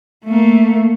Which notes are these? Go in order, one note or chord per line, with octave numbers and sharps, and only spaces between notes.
A3 A#3